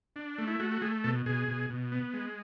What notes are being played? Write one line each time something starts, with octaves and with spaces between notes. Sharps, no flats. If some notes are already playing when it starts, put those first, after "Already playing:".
D4
A3
E4
A3 F#4
F#4
A3 G#4
B2 A4
B2 G#4
B2
B2
B3
G#3